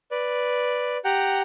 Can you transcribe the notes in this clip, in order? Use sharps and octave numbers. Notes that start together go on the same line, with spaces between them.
B4 D5
G4 F#5 G5 A#5